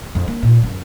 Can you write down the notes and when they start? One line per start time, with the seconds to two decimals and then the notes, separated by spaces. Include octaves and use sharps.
0.15 F2
0.28 A#3
0.43 A#2
0.63 F#2